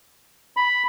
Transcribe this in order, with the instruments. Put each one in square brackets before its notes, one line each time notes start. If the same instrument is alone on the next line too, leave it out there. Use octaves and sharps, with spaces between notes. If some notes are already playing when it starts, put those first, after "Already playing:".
[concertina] B5